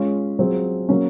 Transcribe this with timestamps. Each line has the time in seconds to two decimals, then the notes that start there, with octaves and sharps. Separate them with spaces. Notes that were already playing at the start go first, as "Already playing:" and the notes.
Already playing: G#3 C#4 F4 G#4
0.39 F#3 C4 F4 G#4
0.89 F#3 A#3 C#4